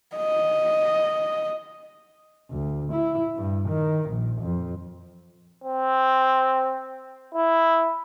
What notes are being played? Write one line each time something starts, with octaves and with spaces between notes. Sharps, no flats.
D#5
D2
E4
G2
D#3
A#1
F2
C4
E4